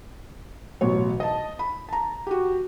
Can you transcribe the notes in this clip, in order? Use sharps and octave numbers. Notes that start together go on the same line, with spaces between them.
A1 B2 F#3 C#5
D#5 A5
B5
A5 A#5
F#4 G4